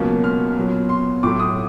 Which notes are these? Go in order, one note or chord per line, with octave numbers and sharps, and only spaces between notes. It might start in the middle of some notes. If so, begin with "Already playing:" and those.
Already playing: C#2 B2 F#3 A#3 C#4
F6
A#2 F#3 B3
C6
A2 F#3 A3 D6
D#6